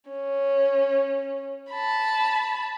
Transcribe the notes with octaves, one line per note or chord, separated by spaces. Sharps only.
C#4
A5 B5